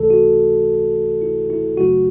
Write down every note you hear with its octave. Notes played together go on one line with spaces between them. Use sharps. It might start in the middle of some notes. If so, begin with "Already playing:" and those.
Already playing: C#2 C3 E3 A3 A4
F#4
E4
E4
G#1 F#2 C#3 F#3 A3 F#4